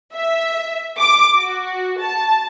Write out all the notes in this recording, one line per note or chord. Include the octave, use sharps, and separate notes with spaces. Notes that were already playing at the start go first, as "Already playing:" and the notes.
E5
D6
F#4
A5